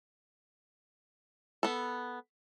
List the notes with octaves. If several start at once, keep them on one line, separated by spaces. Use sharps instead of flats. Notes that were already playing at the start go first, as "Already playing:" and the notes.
B3 A4